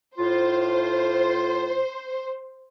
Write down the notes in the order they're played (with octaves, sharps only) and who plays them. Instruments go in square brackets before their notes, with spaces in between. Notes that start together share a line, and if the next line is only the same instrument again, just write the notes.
[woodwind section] A2 F4 [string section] C5